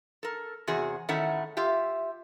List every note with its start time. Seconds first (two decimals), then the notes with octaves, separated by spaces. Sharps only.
0.23 A4 A#4
0.67 E2 C3 F#4 G#4
1.09 A2 D#3 A3 C#4 E4 F#5
1.57 F4 G4 E5